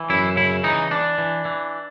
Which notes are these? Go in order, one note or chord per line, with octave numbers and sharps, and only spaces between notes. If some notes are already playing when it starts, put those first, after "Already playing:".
Already playing: E3
F#2 E4
C#3 E4
E3 D#4
E3 D4
E3
E3